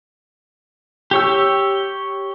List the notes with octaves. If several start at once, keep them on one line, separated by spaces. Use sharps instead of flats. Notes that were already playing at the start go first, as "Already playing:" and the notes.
G4 C#5 E6